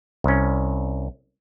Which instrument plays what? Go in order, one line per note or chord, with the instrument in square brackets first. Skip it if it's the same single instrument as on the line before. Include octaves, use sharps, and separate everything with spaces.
[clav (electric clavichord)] C2 C#4